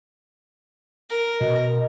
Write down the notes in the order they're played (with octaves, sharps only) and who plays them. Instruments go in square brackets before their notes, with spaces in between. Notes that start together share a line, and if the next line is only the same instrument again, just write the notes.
[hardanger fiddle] A#4
[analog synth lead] B2 [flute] D#5